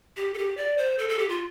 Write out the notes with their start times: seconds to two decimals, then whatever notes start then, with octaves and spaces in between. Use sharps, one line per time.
0.17 G4
0.34 A4
0.38 G4
0.57 D5
0.78 C5
0.99 A4
1.09 A4
1.19 G4
1.29 F4